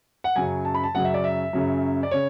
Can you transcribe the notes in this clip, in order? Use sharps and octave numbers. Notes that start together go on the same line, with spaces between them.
F#5
F#2 C#3 F#3 G#5
A5
B5
A5
F#2 C#3 F#3 F#5
E5
D5
E5
F#2 C#3 F#3
D5
C#3 C#5